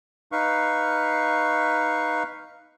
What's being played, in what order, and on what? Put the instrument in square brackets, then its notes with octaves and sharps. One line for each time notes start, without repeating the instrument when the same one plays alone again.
[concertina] D#4 B4 F5 C#6